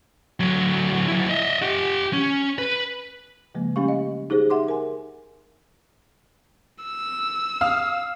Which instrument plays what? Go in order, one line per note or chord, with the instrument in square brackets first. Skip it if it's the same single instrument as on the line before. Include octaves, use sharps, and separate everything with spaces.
[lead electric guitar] D2 F#3
F#3 E4
D#5 E5
G4 F#5
C#4
B4
[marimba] C#3 F3 G#3 A#3
G3 A3 C#4 G4 F5 C#6
D#5
D#4 G4 G#4 C5
E5 F#5 C6 D6
A#4 G#5
[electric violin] E6
[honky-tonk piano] F5 D#6 F6